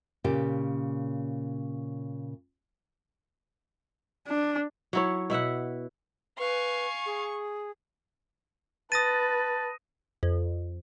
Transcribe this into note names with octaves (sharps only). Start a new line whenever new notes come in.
A#2 C#3 G4
D4
F#3 E4 C#5
B2 E4 E5 F#5
B4 F5 G#5 C#6
G#4
B4 A5 D#6 A6 A#6 D#7
F2